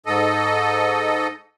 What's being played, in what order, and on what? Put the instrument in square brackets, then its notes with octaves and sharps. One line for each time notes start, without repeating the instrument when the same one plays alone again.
[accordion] G#2 A4 D#5